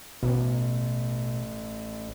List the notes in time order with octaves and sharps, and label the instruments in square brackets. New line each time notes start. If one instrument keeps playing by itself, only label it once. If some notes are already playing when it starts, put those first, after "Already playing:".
[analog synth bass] A1 [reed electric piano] B2